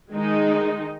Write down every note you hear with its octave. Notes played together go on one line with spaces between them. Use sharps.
D#3 G#3 D#4